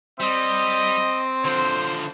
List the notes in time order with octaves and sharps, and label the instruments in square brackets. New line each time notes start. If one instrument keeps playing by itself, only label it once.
[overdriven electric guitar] G3 [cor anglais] C4 [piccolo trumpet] D#5
[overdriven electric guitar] D3 F3 [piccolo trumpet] C5